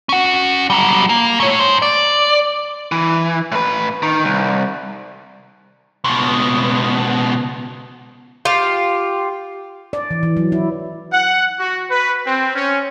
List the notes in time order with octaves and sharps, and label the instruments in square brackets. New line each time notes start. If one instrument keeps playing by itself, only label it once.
[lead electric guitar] C#4 F#5
F#3 G3
A#3
A3 C#5
G#2 C5
D5
E3
A2 B4
D#3
C2
C#2 B2
[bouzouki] F4 G4
[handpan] D5
E3
E3
F#3
E4
[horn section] F#5
F#4
B4
C4
C#4